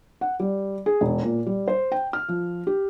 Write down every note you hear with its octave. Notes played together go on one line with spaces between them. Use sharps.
F#5
G3
G#4
E1
A#2
G3
C5
G5
F6
F3
G4